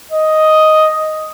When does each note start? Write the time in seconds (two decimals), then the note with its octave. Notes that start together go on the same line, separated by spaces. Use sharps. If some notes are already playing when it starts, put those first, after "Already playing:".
0.12 D#5